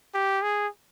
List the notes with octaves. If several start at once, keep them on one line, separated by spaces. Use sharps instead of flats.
G4
G#4